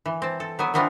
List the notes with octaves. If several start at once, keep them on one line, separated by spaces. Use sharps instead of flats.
E3
C4 A5
A4
F#3 B3 G#5
E3 G3 B3 C4 D4 F4